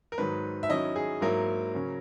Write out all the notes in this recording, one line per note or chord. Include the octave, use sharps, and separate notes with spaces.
A#4
G#2 D#3 F#3 B4
E5
D#3 F#3 C#4 E4 D#5
G#4
G#2 F#3 A#3 E4 A#4
C#3 F#3 C#4